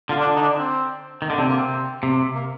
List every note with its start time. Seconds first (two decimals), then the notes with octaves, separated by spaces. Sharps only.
0.09 D3 F4
0.21 D4
0.36 D#4
0.42 D4
0.58 C4
1.22 D#3
1.30 D3
1.38 C3 C4
1.48 A#3
1.58 C4
2.03 C3
2.35 A#3